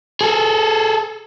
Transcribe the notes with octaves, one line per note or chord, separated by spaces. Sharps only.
G#4 A4